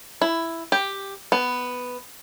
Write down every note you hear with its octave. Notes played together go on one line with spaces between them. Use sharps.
E4
G4
B3